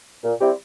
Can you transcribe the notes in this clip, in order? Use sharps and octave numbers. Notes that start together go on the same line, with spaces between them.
A#2
G3 C4 E4 G4